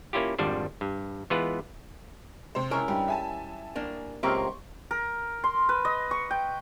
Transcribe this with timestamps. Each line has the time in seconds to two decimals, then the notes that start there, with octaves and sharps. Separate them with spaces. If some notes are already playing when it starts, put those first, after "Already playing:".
0.13 A#3 C#4 E4 F4 G4
0.39 G#1 F2 F3 G3 D4 C5
0.81 G2
1.30 E3 G#3 B3 F4 G#4 B4
2.55 C3 C5
2.71 G#3 C#4 E4 A#4
2.88 G2 G3
3.08 E5 G#5 A5
3.76 A#3 D4
4.23 C#2 A#3 C4 G4 A#4 E5 C6 C#6
4.91 A#4
5.44 C6
5.69 B4
5.85 D#5
6.11 C#6
6.31 G5